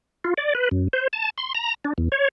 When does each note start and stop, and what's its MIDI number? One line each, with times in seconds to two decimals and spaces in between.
0.24 0.34 65
0.38 0.53 74
0.55 0.69 71
0.71 0.88 42
0.93 1.08 72
1.13 1.30 81
1.38 1.53 84
1.55 1.74 82
1.85 1.93 62
1.98 2.09 40
2.12 2.28 73